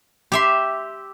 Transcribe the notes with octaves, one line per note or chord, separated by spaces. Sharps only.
G4 E5 C6